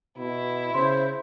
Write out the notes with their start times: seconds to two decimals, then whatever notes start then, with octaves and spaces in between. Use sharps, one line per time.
0.18 B2 E4
0.74 C#3 C5 C6